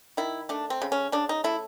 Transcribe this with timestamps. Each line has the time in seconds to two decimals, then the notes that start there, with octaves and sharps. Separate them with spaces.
0.17 D#3 E4
0.49 A3 D4
0.70 C4
0.82 C#3
0.92 C#4
1.12 C#3 D4
1.29 D#4
1.44 A3 E4